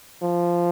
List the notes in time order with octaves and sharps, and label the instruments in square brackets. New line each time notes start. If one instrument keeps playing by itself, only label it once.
[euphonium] F3